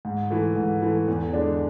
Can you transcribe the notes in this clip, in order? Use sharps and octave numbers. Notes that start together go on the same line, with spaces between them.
G#2
E3 A3
G#2
E3 A3
E2
D3 G#3 D4